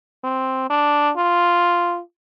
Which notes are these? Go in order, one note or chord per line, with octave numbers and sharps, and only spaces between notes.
C4
D4
F4